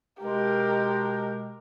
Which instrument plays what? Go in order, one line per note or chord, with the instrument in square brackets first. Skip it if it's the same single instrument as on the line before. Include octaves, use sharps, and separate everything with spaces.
[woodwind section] B2 G#3 [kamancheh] G4 A#4